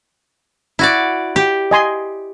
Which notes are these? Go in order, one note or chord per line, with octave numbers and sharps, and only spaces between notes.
E4 F#4 D5
G4
D#5 G#5 C6